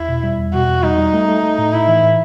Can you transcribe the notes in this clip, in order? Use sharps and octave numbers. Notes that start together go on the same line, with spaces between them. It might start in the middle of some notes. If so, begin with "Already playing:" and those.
Already playing: E2 E4
B2
G3
E2
B2 F#4
E2
G3 D#4
G3
A3
A3
A3
A2
A2 E4
E3
A2